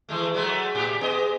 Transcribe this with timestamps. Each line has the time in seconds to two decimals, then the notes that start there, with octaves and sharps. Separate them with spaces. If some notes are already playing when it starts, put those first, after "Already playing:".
0.09 E3 G#3 A3
0.34 F#3 G#3 A3
0.75 A2 G4
1.01 B3 G#4 D#5